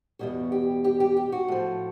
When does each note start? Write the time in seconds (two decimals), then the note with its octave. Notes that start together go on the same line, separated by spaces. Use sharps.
0.19 E2 B2 G3 F#4
0.52 G4
0.84 G4
1.00 G4
1.17 G4
1.32 F#4
1.48 A2 F3